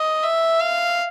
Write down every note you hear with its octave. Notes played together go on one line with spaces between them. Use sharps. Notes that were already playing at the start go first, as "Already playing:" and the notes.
Already playing: D#5
E5
F5